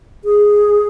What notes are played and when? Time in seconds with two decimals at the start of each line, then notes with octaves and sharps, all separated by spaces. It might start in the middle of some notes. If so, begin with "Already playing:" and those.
0.25 G#4